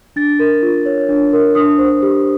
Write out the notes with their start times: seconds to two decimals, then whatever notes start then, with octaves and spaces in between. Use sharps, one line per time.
0.16 D4 A6
0.39 A#4
0.62 F4
0.86 C#5
1.09 D4
1.33 A#4
1.55 D4 D#6
1.78 C5
2.02 G4